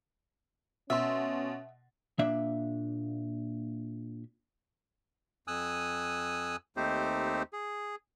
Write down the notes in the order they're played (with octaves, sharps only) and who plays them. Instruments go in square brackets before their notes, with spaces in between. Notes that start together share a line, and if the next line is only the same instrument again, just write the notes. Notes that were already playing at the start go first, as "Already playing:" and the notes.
[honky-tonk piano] B2 C6 [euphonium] C#4 [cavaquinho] E5
[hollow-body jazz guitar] A#2 A#3 D4 E5
[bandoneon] F2 G#5 D#6 E6 F#6
D#2 A3 C4 D#4 G4 C5
G#4